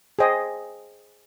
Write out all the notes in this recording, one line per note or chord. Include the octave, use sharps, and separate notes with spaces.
G#4 C5 D#5 G5